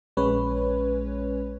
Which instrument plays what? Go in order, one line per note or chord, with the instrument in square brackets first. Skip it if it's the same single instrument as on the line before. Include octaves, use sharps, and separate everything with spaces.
[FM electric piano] A#1 G#3 C#4 B4 C#5